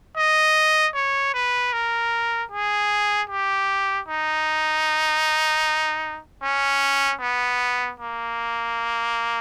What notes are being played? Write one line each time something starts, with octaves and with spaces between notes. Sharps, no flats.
D#5
C#5
B4
A#4
G#4
G4
D#4
C#4
B3
A#3